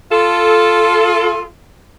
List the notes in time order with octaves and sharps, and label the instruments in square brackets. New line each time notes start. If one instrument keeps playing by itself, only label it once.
[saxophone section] F4 A4